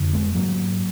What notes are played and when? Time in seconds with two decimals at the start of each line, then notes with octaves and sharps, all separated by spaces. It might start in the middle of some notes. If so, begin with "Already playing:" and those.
Already playing: F2 D3
0.13 G#3 B3
0.35 G#2 F#3 A#3